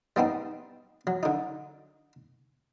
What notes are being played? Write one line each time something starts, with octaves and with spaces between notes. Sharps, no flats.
G3 B3 C4 D#4
F#3
D3 D#4